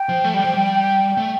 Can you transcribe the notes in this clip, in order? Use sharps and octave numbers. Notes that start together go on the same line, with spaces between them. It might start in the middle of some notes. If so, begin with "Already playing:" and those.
Already playing: G5
F3
A3
G3
F3
G3
A3